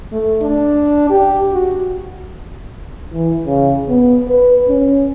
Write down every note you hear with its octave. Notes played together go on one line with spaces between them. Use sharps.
A3
D4
G4
F#4
E3
C#3
B3
B4
C#4